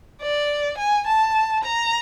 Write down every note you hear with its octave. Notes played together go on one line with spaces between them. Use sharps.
D5
G#5
A5
A#5